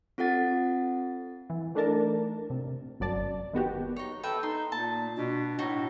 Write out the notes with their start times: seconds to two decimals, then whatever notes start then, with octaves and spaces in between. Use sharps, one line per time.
0.18 C4 F4 A4 F#5 A6
1.50 E3
1.75 E3 A3 D4 D#4 A#4 A5
2.50 C3
3.00 G1 F#2 D5 A5
3.53 D#3 B3 F#4 G4
3.96 D#4 C#5
4.23 A4 B4 E5 G5
4.43 D#4 C6
4.72 A#2 A#3 A5
5.17 B2 D4
5.59 A2 D#4 F#4